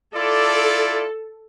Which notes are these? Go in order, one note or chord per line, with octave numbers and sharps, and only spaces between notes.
E4 F4 A4 D5